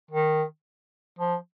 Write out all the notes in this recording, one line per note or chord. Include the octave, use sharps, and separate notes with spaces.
D#3
F3